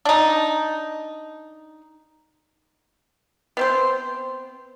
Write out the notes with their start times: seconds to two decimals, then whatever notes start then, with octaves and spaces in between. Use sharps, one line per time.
0.05 D4 D#4
3.57 B3 C4 C5